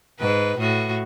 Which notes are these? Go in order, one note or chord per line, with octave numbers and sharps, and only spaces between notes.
G#2 B4
A2 F#4